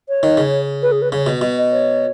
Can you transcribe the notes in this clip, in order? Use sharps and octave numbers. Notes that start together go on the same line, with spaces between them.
C#5
D#3
C#3
B4
G#4
B4
C#3 C#5
B2 D#5
B2
C#5